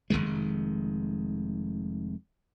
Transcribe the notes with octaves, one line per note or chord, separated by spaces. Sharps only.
F1 C2 D#3 G#3